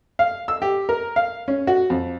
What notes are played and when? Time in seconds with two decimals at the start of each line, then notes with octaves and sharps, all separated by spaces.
0.19 F5
0.48 E6
0.62 G4
0.89 A#4
1.16 F5
1.48 C#4
1.67 F#4
1.90 F2